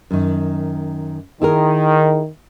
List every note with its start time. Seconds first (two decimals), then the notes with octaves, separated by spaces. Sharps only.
0.11 F#2 D#3
1.42 D#3 E4 G#4 A#4